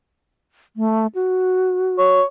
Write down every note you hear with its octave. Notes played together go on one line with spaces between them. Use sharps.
A3
F#4
C#5